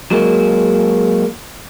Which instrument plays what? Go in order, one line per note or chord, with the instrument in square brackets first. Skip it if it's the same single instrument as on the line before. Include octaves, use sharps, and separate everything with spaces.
[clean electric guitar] F#3 G#3 A#3